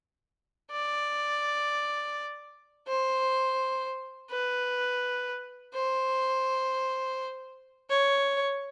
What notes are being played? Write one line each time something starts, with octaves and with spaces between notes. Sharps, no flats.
D5
C5
B4
C5
C#5